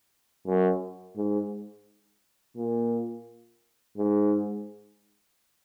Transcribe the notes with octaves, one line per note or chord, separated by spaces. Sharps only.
F#2
G#2
A#2
G#2